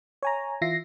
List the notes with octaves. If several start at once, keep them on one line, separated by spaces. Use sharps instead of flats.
C#5 G#5 A#5
E3 F4 E5 A#6 C7